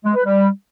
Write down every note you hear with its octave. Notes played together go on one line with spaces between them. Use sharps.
G#3
B4
G3